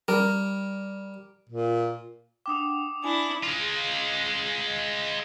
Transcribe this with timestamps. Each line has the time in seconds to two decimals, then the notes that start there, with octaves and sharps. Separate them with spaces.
0.08 G3 A#4
1.49 A#2
2.46 D4 F#5 G5 D6 D#6
3.04 D4 E4 G#5
3.43 G#3 F4